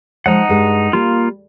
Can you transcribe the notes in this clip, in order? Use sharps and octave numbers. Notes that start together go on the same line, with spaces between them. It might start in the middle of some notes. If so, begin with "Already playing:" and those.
F3 G#3 D#4 D#5 F#5
G2 G#3
G3 A#3 F4